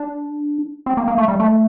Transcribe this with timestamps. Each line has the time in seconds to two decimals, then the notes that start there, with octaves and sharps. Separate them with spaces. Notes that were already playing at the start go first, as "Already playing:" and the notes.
Already playing: D4
0.86 C4
0.97 A#3
1.08 A#3
1.18 A3
1.28 G3
1.40 A3